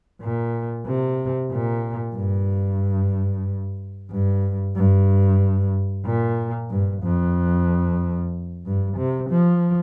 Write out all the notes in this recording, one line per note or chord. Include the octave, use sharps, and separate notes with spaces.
A#2
C3
A#2
G2
G2
G2
A#2
G2
F2
G2
C3
F3